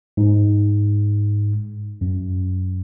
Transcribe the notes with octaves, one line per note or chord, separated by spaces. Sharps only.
G#2
F#2